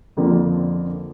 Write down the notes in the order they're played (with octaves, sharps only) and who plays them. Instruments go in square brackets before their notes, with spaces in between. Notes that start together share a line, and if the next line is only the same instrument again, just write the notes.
[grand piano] F2 D3 F3 A#3